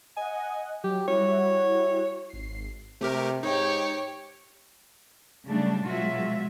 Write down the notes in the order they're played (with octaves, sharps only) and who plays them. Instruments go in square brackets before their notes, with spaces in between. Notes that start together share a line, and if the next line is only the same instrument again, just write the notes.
[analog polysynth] D#5 F#5 [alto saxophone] G#5
[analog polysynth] F#3 [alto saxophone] G4
[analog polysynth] G3 E4 F#4 [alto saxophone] C#5
[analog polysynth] G#1 C7
[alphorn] C3 [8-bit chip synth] A3 G4 A#4
[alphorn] G#2 [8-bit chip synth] D#4 [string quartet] G4 C#5
[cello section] C#3 F#3 G3 A3 D4
B2 F#3 G#3 F4 F#4 E5